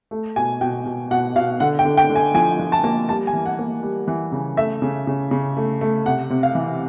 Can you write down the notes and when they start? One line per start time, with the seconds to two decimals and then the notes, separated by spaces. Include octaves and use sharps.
0.11 A3
0.36 B2 G#5
0.61 B2 G5
0.86 B2
1.11 B2 F#5
1.35 B2 F5
1.60 D3 F#5
1.79 G5
1.85 D3
1.97 G5
2.10 D3
2.16 G#5
2.34 F3 G#5
2.59 F3
2.72 A5
2.84 A#3
3.09 G3 A5
3.27 G#5
3.33 E3
3.46 F#5
3.59 A#3
3.83 G3
4.08 E3
4.32 C#3
4.57 A3 E5
4.82 C#3
5.07 C#3
5.31 C#3
5.57 A3
5.81 A3
6.06 C3 F#5
6.30 C3
6.43 F5
6.55 E3